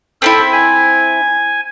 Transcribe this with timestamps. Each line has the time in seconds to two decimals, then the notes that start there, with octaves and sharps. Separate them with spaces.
0.22 C4 D4 E4 A4 B5
0.53 G#5